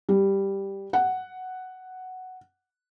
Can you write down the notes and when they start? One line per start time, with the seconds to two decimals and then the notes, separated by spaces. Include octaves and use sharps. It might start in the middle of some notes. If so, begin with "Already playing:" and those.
0.09 G3
0.93 F#5